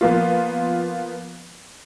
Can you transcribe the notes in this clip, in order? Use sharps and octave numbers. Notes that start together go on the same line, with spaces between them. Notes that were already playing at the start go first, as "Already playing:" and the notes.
F3 A#3 B3 F4